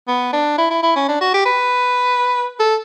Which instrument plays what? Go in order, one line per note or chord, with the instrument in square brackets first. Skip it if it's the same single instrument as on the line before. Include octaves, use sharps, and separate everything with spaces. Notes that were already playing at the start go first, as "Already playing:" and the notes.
[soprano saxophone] B3
D4
E4
E4
E4
C#4
D4
F#4
G4
B4
A4